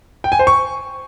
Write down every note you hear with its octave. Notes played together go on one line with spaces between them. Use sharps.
G5
G#5
C5
C#6